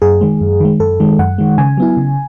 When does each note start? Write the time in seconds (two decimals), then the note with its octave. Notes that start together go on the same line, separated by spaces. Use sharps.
0.02 F#2 G#4
0.21 D#3 G#3
0.41 F#2
0.60 D#3 G#3
0.80 F#2 A4
1.00 D#3 G#3
1.19 F#2 F#5
1.38 D#3 G#3
1.58 C#3 G#5
1.77 F#3 B3 E4
1.97 C#3